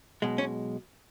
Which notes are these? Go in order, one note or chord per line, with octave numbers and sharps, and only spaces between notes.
B1 B2 G#3
C#4